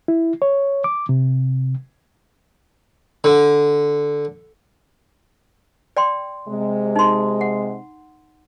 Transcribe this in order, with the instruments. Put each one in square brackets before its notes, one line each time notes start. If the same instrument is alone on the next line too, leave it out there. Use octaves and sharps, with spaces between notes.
[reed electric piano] E4
C#5
D6
C3
[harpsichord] D3
[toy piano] D5 G5 C6
[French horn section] C3 G#3
[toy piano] D#4 C6
F#5